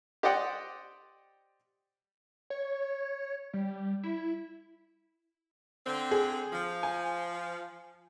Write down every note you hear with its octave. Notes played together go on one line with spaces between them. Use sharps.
G4 C5 D5 D#5 F#5 G5
C#5
G3
E4
D3 C4
G#4
F3
G#5